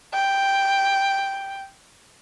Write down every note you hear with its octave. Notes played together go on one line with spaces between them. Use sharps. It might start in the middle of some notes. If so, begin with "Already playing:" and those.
G5